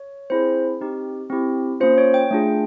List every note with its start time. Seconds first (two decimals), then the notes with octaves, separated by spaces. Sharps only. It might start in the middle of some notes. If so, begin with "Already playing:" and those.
Already playing: C#5
0.30 C4 E4 G#4 C5
0.81 C4 D#4 G4
1.30 C4 E4 G4
1.80 A#3 C#4 F4 C5
1.98 C#5
2.14 G5
2.31 A3 D4 F4 G#4